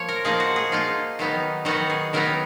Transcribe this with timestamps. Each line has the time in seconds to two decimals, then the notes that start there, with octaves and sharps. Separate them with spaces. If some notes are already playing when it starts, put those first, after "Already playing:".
Already playing: F3 A#3 C#5 F5
0.08 A#4
0.25 F3 A#3 D#4 G#4
0.40 F#4
0.56 G#4
0.72 F3 A#3 D#4 F4
1.19 D#3 F#3 B3 D#4
1.65 D#3 F#3 B3 D#4 F#4
1.90 G#4
2.13 D#3 F#3 B3 D#4 A#4